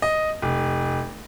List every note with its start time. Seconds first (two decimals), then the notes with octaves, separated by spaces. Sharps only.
0.02 D#5
0.42 F1